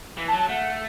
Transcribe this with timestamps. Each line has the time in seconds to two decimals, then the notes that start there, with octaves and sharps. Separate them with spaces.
0.18 E3
0.28 A5
0.33 F#3
0.38 A5
0.49 A3 F#5